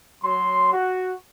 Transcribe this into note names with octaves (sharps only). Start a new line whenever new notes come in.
F#3 C6
F#4